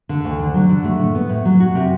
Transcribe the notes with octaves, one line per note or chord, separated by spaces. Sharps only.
D3
D2
D3
F#3
D3
A3
A2
B3
A2
F#3
F#4
C3